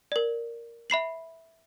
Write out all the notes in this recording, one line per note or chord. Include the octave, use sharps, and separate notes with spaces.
A#4 D5
E5 B5 C7 F#7